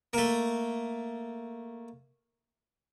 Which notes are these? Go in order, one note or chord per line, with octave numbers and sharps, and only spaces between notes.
A3 A#3